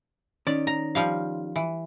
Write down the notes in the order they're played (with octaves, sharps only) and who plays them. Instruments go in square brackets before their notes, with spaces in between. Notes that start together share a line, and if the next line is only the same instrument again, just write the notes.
[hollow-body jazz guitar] D#3 C#4 [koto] D5
[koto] A#5
F3 G3 F5
E3